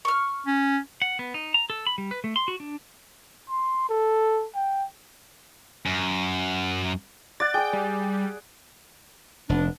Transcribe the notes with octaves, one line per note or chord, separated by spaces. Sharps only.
C#6 F6
C#4
F#5
B3
D#4
A#5
A4
B5
G3
B4
A3
C6
F#4
D4
C6
A4
G5
F#2
D5 F#5 A6
G#4 D5 G5
G3
F1 B3 D4